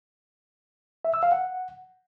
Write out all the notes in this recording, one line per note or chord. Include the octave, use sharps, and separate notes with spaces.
E5
E6
F5
F#5